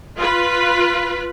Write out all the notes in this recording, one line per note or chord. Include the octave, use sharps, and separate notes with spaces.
F4 B4